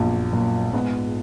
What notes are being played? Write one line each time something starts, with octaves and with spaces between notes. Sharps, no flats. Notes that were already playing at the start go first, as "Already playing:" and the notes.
Already playing: A#1 F#2 F#3 B3
F#2 A#2 F#3
G#2 G#3 B3